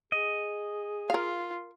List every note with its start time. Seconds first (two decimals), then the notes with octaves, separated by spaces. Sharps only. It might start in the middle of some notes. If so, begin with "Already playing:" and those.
0.12 G#4 D#5
1.10 F4 A#4 F5